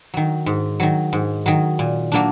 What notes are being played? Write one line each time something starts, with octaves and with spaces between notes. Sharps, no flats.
D#3 F#3
G#2
D#3 F#3
G#2
D#3 F#3
A#2
F#3 A#3 D4